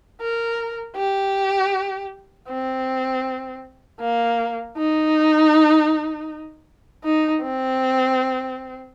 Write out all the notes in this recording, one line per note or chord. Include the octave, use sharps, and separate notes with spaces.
A#4
G4
C4
A#3
D#4
D#4
C4